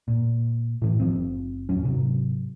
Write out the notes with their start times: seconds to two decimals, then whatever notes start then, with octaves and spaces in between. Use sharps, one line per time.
0.08 A#2
0.82 A2 E3
1.00 F#1 C#2 F3 C4
1.69 D#1 E2 F#3 C#4
1.83 G#2 C3 F#3